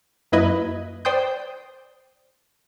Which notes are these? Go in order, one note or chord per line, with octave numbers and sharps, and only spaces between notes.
F#2 A#3 E4 B4 D#5 G#6
C5 D5 G5 C6 D#6 G6